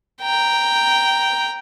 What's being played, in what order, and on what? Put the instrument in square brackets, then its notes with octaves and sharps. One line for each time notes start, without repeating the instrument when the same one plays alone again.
[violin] G5 A#5